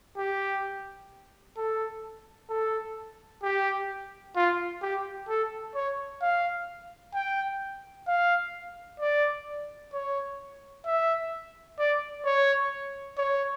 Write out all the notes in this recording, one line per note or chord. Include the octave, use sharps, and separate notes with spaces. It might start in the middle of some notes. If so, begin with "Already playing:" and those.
G4
A4
A4
G4
F4
G4
A4
C#5
F5
G5
F5
D5
C#5
E5
D5
C#5
C#5